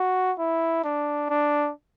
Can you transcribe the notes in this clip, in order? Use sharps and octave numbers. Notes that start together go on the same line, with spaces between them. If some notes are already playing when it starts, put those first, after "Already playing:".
Already playing: F#4
E4
D4
D4